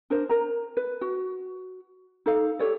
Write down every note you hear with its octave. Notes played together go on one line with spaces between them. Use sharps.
D4 A#4 C5
A#4 A#5
B4
F#4
D#4 A4 F5
G4 A4 C#5 D5